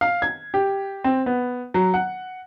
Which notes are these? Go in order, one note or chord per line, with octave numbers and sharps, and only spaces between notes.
F5
G#6
G4
C4
B3
F#3
F#5